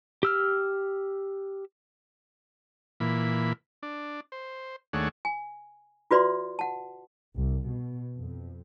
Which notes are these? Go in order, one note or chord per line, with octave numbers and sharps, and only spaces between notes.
G4 E6 F6
A#2 E3 B5
D4
C5
D#2 A3 D4 G#4 C#5 F#5
G#5
F4 F#4 B4 D5 E5 C6
F#5 A5
C2
B2
F2